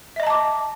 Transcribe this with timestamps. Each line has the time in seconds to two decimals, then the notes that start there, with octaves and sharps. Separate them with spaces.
0.16 E5
0.20 D#5
0.23 A#5
0.27 A5
0.30 D6